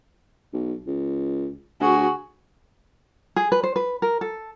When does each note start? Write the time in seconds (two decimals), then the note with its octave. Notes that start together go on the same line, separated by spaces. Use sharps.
0.53 B1
0.87 C#2
1.80 D2 F#4 G#4
3.36 G#4
3.52 B4
3.63 C5
3.76 B4
4.02 A#4
4.21 A4